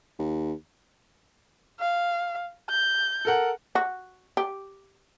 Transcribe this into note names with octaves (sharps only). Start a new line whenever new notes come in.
D#2
F5
G6
A4 A#4 F#5
F#4
G4